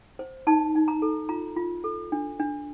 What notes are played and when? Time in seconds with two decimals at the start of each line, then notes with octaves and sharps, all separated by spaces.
0.19 C5
0.47 D#4 A5
0.75 D#4
0.88 A#5
1.02 A4
1.29 F4 A#5
1.56 F4
1.84 A4
2.12 D4
2.40 D4